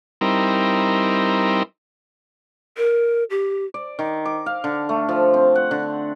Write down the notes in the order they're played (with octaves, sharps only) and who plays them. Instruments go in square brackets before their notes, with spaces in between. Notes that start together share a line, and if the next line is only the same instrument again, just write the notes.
[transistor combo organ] G3 C4 D#4 E4 A#4
[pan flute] A#4
G4
[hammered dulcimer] D5
D#3
D6
F5
D3
A3
F3
C4
F#5
D3